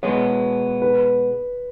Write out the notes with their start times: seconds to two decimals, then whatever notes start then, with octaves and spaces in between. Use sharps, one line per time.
0.03 B2 G#3 B3 C#5
0.82 B4